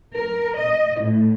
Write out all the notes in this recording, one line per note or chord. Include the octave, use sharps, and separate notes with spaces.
A#4
D#5
A2